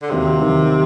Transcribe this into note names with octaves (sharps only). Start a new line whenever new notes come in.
D3
D#2 C3 D#3 F#3 C4
D#2 D#3 F#3 C4